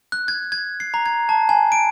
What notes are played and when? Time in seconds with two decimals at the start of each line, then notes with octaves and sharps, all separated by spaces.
0.12 F#6
0.28 G#6
0.52 G#6
0.80 C7
0.94 A#5
1.06 G#6
1.29 A5
1.49 G#5
1.72 D7